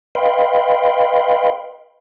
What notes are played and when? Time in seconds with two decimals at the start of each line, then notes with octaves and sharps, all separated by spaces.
0.15 B4 D#5 F5 G5 B5 C6